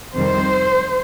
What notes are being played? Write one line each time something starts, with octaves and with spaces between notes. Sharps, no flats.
F2 C3 D#3 G3 C5